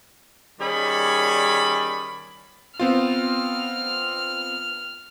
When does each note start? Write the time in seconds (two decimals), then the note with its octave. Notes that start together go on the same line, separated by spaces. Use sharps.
0.60 D#3 G3 C#4 G#4 D5 B5
2.79 B3 C4 F4 F6